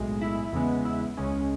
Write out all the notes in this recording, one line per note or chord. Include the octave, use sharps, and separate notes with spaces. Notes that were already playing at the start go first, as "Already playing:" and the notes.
Already playing: B1 A2 G#3
E4
E2 C#3 G#3 B3
E4
C#2 C#3 G#3 C#4